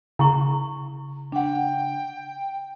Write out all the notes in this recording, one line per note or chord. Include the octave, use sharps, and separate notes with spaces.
C#3 E4 A#5 C#6
D4 F#5 G5